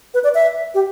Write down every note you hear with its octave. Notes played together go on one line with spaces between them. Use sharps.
B4
D5
E5
G4